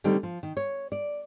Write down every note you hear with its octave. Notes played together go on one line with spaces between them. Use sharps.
D3 D#3 G3 A3 C4 D#4
F3
D#3
C#5
D5